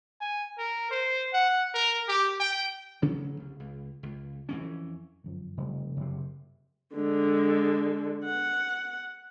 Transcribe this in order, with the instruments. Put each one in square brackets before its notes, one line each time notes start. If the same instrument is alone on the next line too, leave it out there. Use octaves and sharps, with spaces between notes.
[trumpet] G#5
A#4
C5
F#5
A#4
G4
G5
[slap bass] A1 C#3 F#3 C#4
C2
C#2
C#2
F2 E3 C#4
[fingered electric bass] G1 F#2 F3
[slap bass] F1 [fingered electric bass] C#3 F3 G3
[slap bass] F#1 C3
[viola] D3 G#3
F#5